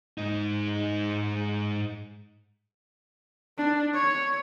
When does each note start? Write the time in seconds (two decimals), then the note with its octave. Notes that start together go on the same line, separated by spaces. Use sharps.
0.18 G#2 D#4
3.58 D4
3.95 C#5